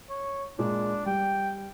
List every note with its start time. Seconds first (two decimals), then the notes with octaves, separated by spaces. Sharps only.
0.10 C#5
0.59 A#2 G#3 D4
1.06 G3 G5